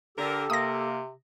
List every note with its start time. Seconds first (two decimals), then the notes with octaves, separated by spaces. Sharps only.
0.18 D3 G4 A4 A#4
0.50 C3 A#3 D#6 A#6